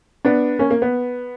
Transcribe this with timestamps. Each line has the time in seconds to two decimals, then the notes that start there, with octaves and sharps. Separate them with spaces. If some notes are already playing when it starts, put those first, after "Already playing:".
0.25 B3 D4
0.59 A#3 C#4
0.71 A#3
0.82 B3